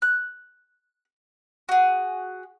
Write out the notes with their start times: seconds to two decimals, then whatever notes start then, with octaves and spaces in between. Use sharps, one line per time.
0.02 F#6
1.69 F#4 G#4